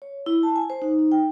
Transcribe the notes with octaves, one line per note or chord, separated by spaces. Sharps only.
C#5
E4
A5
G#5
C5
D#4
D#4
G5